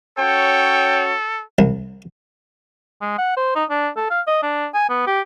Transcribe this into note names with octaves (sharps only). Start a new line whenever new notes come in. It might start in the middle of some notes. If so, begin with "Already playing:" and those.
C#4 F#4 A4 C#5 G5
C2
G#3
F#5
C5
D#4
D4
A4
F5
D#5
D4
G#5
B3
G4